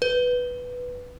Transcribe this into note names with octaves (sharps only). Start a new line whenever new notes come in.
B4